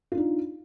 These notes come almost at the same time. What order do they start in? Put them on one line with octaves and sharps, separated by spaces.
F4 D4 D#4